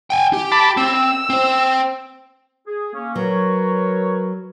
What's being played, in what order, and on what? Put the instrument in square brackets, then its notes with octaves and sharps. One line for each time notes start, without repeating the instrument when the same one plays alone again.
[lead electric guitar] G5 G#5
G4
[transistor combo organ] A5 B5 D6
[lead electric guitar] C4 [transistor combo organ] E6
[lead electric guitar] C4 C5
[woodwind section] G#4
A#3 C#4
[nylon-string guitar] F#3 [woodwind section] A#4 B4 C#5